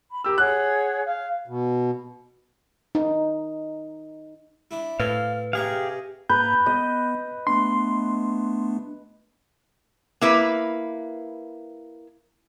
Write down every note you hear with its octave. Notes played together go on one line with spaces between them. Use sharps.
B5
G4 A#4 E6
G#4 C#5 F#5 F#6
F5
B2
D#4
D4 E4
A2 C4 B4 F5
C3 G4 G#4 C#5 F5 A#5
G#2 A#3 B4 A#5 G6
B3 D#5
A3 B3 D4 C6
A#3 E4 B4